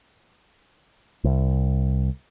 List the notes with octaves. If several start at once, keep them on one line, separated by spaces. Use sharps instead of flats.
C2